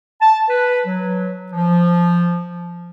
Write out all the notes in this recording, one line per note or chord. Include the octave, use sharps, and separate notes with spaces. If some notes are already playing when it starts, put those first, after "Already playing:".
A5
B4
F#3
F3